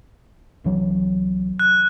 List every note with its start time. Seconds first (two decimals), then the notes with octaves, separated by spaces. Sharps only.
0.64 C2 E3 F#3
1.59 F#6